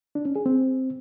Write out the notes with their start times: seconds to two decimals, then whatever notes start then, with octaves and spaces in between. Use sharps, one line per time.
0.15 D4
0.25 C#4
0.36 G#4
0.46 C4